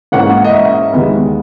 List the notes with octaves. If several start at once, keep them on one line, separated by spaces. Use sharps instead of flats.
G#2 E3 A#3 C#4 F#5
D#5
E5
D#2 D#3 G#3 B3